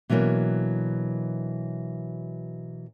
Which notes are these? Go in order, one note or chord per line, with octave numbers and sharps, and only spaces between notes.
B2 E3 F#3 A#3 D4